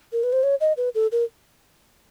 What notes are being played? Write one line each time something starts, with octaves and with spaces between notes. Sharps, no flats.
A#4
B4
C5
C#5
D#5
B4
A4
A#4